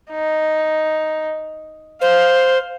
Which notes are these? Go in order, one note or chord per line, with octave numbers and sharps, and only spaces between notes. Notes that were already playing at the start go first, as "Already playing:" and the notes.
D#4
C5 F5